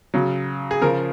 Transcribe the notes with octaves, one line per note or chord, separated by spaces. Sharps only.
C#3 F#3
G#4
C#3 F3 A#4